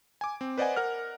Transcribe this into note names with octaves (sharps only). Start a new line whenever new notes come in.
G#5 D6
C4
B4 C5 D5 D#5 F#5 G#5
A#4 F#5 F6